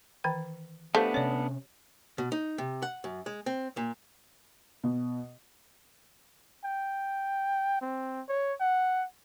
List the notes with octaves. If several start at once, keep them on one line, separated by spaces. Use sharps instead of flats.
D#3 E3 G5
A3 B3 D4 G4 C5 F5
C3 C#4 C#5 D5
B2
D#4
C3
F#5
F#2
G#3
C4
A#2
B2
G5
C4
C#5
F#5